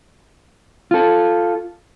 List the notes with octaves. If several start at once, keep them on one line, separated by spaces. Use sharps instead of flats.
F4 A4